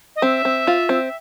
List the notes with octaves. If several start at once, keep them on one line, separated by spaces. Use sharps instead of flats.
D#5
C4 E5
C4
F4
C4